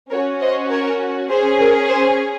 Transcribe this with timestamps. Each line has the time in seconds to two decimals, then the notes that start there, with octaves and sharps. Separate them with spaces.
0.11 C#4 F#4 A#4 C#5
0.41 C5 D#5
0.70 A#4 C#5
1.29 C#4 G#4 C5
1.59 A#4
1.88 C5